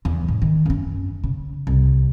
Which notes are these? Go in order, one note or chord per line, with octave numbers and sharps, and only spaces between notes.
E2 E3
G#2
D#3
F#2 C#4
C#3
C2